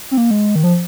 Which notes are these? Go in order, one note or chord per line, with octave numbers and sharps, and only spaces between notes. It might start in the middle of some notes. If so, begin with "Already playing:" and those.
C4
A#3
G#3
D#3
F3